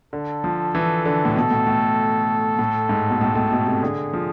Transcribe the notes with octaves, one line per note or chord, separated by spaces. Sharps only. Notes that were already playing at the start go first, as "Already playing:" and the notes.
D3 A4
F3
E3
D3
A2
B2 A4
A2
A2
A2
G#2
B2
A2
A2
B2
C3
D3 G#4
F3